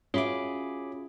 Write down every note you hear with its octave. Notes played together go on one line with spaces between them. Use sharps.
C#4 F4 F#4 G#4 E5 B5 D6